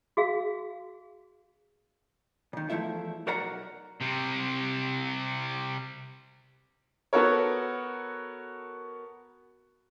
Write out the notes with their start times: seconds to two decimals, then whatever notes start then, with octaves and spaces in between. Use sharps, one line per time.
0.17 F#4 G#4 F5
2.53 A#2 D#3
2.70 E2 B2 F3 A3 E4 E5
3.27 B1 F#4 A#4 D5 F#5 A#5
4.01 C3 G3
7.13 B3 F#4 A4 A#4 C#5